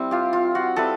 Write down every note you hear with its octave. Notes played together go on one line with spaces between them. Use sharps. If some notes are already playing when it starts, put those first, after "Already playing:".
Already playing: G3 C4 E4
F4 G4
F4
F#4
G3 C4 E4 A4 B4